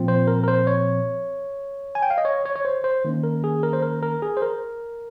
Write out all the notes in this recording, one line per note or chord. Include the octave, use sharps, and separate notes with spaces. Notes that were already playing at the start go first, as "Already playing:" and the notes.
Already playing: A#2 F3 C4
C5
A#4
A#4
C5
C#5
G#5
G5
F5
D#5
C#5
C#5
C#5
C5
C5
D#3 A#3 C#4
A#4
G#4
A#4
C5
A#4
A#4
G#4
C5
A#4